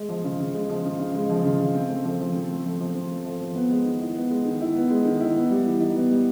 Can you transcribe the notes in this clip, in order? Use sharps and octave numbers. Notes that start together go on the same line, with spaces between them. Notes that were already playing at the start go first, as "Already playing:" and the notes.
Already playing: G#3
F3
C#3
C#3
G#3
F3
C#3
C#3
G#3
F3
C#3
C#3
C4
A3
F3
F3
C4
A3
F3
F3
C4
A3
F3
F3
B3
G#3
D#3
E4
B3
G#3
D#3
E4
B3
G#3
D#3
E4
B3
G3
E3
D#4
B3
G3